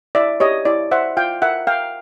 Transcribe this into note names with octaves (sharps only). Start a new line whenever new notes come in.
E4 D5 E5
G4 C#5 D#5
E4 D5
C5 E5 F#5
F4 F5 G5
A#4 E5 F#5
A#4 F5 G5